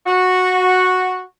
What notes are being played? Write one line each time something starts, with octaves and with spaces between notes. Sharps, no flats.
F#4